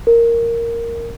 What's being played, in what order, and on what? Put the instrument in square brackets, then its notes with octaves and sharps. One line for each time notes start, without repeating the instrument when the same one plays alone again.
[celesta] A#4